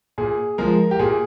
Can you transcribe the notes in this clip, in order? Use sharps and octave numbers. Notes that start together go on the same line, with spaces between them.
A#2 G#4
F3 G#3 A#4
G4
A#2 G#4